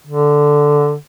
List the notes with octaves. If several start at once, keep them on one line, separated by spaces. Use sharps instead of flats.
D3